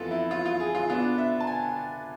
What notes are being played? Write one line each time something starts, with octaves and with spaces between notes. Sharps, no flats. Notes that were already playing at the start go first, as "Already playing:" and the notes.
Already playing: F2 E3 B3 F4 A4
E4
F4
F4
G#4
F4
B2 B3 D4 F4
E5
A5
G#5